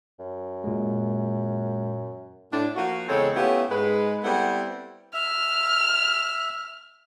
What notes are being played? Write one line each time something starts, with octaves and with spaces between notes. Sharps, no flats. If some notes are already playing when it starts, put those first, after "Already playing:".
F#2
A#2 G#3
A2 D4
F3 A#3 F4 F#4
E2 C#3 G#3 C4 A4 C#5
A3 B3 C#4 E4 F4 G4
G#2 G#3 B4
G3 B3 C4 E4 A4 F#5
E5 F6